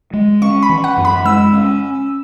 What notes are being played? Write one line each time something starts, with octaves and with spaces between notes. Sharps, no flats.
G#3
C#4 C#6
B5
E3
F#5
F#2
B5
G#3 E6
C#4